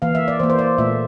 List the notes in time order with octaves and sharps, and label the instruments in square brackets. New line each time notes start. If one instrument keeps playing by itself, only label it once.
[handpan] E3 A#3 F5
E5
D5
E3 A#3 C5
C5
D5
A#2 A3 E5